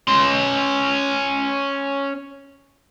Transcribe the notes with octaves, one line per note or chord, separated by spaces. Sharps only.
C#4 C6